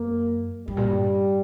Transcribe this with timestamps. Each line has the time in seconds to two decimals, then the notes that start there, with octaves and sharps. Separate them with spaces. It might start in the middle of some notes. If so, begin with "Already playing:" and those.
Already playing: F#2 A#3
0.67 G2 G3
0.77 A#2
0.87 G2